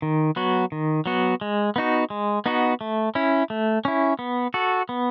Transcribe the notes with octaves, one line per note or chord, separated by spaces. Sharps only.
D#3
F#3 B3 F#4
D#3
F#3 B3 F#4
G#3
B3 D#4 F#4
G#3
B3 D#4 F#4
A3
C#4 E4
A3
C#4 E4
B3
F#4 A4
B3